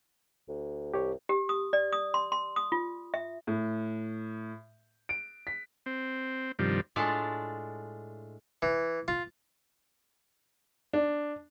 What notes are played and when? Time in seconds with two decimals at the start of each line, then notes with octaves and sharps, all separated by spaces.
0.49 D2
0.94 C2 G4 C#5
1.29 G4
1.49 D#6
1.73 D5
1.93 D#6
2.14 C6
2.32 C6
2.56 D#6
2.72 F4
3.14 E5
3.47 A2
5.09 D7
5.47 B6
5.86 C4
6.59 G2 C3 D#3 F3 G3
6.96 A2 G#3 D4 F4 A5
8.62 E3
9.08 F4
10.93 D4